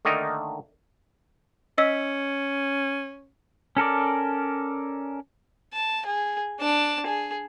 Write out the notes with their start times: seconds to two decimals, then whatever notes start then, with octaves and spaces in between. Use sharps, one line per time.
0.05 D3 D#3 A3 A#3 D#4 A#4
1.78 C#4 D#5 E6 B6
3.77 C#4 A4 A#4 D5
5.74 A5
6.06 G#4
6.60 D4 A5
7.06 G#4